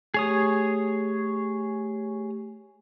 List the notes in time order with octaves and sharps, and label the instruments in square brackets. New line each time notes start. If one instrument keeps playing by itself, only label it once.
[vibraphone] A3 G4 [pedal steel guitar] G#4 C#5 D#6